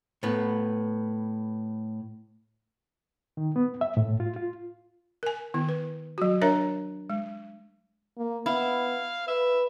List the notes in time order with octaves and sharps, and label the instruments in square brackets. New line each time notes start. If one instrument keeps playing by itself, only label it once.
[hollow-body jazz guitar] A2 B3
[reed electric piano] D#3
B3
E5
A2
F4
F4
[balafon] A#4 G#5
D#3 B3 E4
B4
F#3 F#4
D4 A#4 C#5 E5 A#5
G#3
[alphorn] A#3
[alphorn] B3 [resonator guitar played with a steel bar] E4 [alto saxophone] F5
[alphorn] B4 [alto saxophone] E5